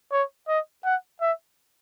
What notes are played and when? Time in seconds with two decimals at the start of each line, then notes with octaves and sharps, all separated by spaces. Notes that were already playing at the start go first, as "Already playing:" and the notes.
0.12 C#5
0.48 D#5
0.85 F#5
1.21 E5